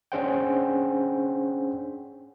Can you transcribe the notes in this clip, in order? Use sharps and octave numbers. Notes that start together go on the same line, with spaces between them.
C#4 D4 G#4 C5 F#5 G5